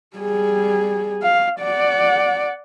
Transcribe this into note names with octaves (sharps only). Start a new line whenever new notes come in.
G3 G#4
F5
D5 F#5